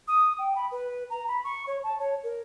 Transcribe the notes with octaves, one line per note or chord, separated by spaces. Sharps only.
D#6
G5
B5
B4
A#5
B5
C#6
C#5
A5
C#5
A#4